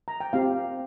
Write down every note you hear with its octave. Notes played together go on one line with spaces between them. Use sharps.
A#5
G5
C4 G4 F5